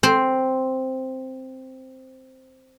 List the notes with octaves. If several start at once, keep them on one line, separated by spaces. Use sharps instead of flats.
C4 C5